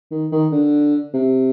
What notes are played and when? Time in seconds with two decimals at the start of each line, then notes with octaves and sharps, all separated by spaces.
0.11 D#3
0.32 D#3
0.52 D3
1.14 C3